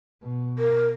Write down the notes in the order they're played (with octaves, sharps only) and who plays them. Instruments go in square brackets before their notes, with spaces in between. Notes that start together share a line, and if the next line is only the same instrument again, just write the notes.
[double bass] B2
[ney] A#4